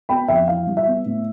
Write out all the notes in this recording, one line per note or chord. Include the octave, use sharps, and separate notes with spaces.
B3 G5 B5
F2 E5 G5
E3 F5
G3
E5
B3
A2